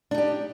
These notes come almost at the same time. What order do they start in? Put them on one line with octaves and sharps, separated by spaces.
D4 D#4 G4